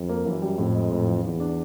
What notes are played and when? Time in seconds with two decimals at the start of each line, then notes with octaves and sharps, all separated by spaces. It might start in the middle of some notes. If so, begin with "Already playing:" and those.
Already playing: F2
0.09 A#3
0.26 F#2 E3
0.42 G3
0.58 F2 A2
0.75 G#3
0.91 A2
1.07 E3
1.24 E2 E3
1.40 D4